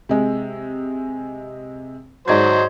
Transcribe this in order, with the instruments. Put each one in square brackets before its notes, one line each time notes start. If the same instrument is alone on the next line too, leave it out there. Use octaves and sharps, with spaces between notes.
[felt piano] C3 G#3
[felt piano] G#2 D5 G#6 [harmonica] F#3 C5